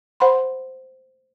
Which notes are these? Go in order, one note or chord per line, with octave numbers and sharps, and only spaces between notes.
C5 F#5 B5 C6